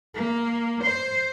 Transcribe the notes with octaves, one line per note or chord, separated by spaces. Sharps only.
A#3
C5